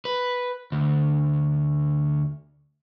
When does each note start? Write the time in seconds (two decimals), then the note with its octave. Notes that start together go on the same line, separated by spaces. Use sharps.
0.05 B4
0.72 D2